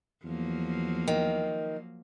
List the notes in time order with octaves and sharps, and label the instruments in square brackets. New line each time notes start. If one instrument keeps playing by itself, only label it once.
[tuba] E2 [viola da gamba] F3 F#3 A#3
[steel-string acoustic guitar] D#3